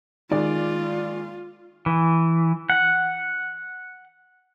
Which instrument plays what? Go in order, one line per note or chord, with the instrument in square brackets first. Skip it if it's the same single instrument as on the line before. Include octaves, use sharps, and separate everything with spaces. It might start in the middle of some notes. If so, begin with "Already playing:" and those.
[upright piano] D#3 G#3 D5 [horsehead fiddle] F4
[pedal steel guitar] E3
F#5